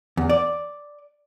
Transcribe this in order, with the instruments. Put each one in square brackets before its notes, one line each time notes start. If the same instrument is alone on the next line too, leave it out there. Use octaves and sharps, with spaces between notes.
[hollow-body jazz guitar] E2
D5